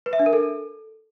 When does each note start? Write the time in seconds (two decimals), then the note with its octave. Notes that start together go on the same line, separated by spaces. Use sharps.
0.06 B4
0.13 E5
0.19 D4
0.26 A#4
0.33 A4